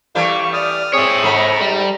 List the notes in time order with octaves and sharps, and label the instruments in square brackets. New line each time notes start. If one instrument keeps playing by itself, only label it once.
[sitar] E3 G3 A3 [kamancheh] F5 C#6
[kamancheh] D5 [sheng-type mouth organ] D#6 F6
[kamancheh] C4 [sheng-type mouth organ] G#4 D#6 [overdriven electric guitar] C#5 E5
[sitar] G#2 A3 [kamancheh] A#5 [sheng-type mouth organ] B5
[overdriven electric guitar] G3